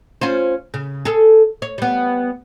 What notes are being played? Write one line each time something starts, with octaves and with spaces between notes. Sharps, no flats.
C#4 F4 C5
C#3
G#4 A4
C#5
G3 B3